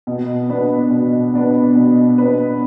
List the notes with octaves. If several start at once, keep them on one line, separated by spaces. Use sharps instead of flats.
B2
B3 D4 B4
B2
B3 D4 B4
B2
B3 D4 B4